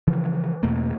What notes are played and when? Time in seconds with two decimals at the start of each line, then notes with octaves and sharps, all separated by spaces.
0.07 C#3 E3 F3
0.63 E2 B2 A3 A#3